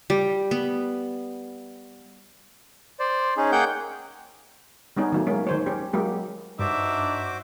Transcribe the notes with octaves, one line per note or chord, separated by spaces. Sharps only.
G3
B3
C5 D5
C#4 D#4 G#4
A#3 G#4 F#5 G5 G6
G3 B3 C#4 D#4
D#3 F#3 A3
G#3 A#3 C#4
D#3 C5 C#5
C#4 G4
F#3 G#3 A#3 G4
G2 D4 D#4 F#4 C5 D5 E5 D6